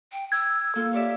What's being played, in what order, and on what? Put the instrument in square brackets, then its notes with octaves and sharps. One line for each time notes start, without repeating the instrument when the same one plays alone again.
[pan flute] G5
[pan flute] E6 [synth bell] G#6
[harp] A#3 F4 [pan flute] A4
[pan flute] G4 [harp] C#5 D5 E5